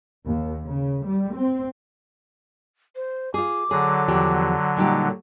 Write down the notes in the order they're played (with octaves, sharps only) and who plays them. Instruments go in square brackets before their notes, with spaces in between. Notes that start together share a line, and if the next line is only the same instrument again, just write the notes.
[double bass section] D#2
C#3
G3
C4
[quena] C5
[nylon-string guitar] F4 G#4 [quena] D6
[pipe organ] D3 F#3 [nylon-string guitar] G#4
[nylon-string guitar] E2 F3 G4
[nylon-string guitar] A#2 G3 G4 [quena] D#4